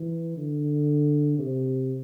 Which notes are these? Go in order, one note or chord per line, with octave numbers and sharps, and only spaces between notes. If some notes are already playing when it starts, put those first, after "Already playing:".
Already playing: E3
D3
C3